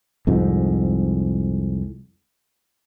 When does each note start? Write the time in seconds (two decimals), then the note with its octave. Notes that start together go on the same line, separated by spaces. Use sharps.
0.27 C2 F2 G#2